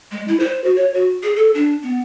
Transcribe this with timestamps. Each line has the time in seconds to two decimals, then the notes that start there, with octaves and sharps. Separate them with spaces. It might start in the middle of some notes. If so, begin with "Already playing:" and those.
0.11 G#3
0.28 E4
0.40 C5
0.64 F#4
0.76 C#5
0.94 F#4
1.23 G#4
1.36 A4
1.54 D4
1.83 B3